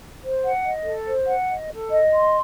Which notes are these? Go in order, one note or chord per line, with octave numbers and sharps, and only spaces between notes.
C5
F#5
D#5
A4
C5
F#5
D#5
A4
D#5
C6